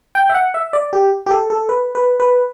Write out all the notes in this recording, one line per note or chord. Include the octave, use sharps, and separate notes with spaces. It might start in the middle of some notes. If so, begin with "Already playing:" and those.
G5
E5
F#5
E5
D5
G4
G4
A4
A4
B4
B4
B4